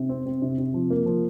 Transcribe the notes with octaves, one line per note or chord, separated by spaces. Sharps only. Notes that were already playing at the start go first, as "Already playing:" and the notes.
Already playing: C3
C4
C4
C3
C3
F3
A#3
F3